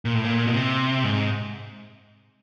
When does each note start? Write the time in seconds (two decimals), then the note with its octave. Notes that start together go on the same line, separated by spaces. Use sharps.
0.05 A#2
0.15 A2
0.24 A#2
0.46 B2
0.54 C3
1.04 G#2